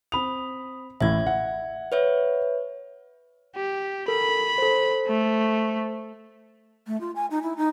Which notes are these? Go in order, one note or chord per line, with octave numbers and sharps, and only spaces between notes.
C4 B5 D#6 F7
A1 A2 E5 G#6
F#5
B4 C#5 E5
G4
A4 A#4 B5
A4 C5
A3
A3
F4
G#5
D#4
E4
D#4